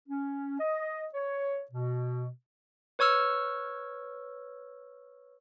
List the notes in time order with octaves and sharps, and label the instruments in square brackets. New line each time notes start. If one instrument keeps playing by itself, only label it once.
[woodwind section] C#4
D#5
C#5
B2
[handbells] B4 C#5 C#6 E6 F6